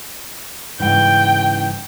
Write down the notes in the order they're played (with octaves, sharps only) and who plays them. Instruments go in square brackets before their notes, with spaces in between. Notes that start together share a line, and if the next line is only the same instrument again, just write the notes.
[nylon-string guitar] G#2 C#3 E3 [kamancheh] G5